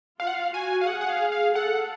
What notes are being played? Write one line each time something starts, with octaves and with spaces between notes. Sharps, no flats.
F4 F5
F#5
F5
F#4 G#5
F5
G#4 F#5
F#5
F5
F5
A4 F#5